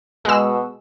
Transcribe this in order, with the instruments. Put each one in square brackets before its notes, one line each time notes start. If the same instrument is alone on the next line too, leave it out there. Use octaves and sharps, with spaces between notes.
[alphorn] B2 [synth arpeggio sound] G#3 E6